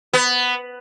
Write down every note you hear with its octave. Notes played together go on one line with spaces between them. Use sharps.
B3